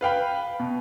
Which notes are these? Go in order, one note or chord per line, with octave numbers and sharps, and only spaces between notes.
B4 F5 G5 B5
B2